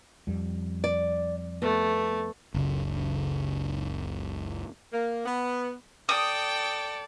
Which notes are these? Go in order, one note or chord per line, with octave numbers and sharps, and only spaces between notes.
F2 G3
D5
A3 B3
F#1 C#2 C#3
A#3
B3
A4 D5 G5 D#6